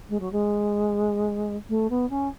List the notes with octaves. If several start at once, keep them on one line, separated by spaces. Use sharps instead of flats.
G#3
F#3
G#3
A3
B3
C#4